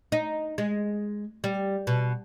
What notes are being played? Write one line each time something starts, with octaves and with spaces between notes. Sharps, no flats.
D#4
G#3
G3
B2